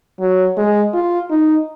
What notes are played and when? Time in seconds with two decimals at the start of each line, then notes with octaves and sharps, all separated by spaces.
0.20 F#3
0.57 G#3
0.94 F4
1.30 D#4